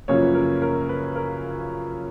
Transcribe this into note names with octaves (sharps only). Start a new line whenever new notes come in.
F#2 C#3 F3 A#3 C#4 C#5
B4
A#4
A#4
B4
A#4